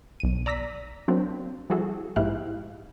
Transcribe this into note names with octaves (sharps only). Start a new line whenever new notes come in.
B1 D#7
D5 A#5 E6 A#6 B6
F#3 A#3 C4 D4
F3 G3 E4 F#4 G#4 A4
A#1 G#2 E4 G4 F5 F#6